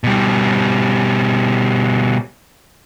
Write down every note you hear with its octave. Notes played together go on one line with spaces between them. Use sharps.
B2 G3